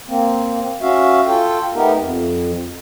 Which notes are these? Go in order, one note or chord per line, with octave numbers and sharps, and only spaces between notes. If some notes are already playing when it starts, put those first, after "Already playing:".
A#3 C4
C#4 F#4 E5 F5
F4 A4 G5
A3 B3 D#4 G4 A#4
F2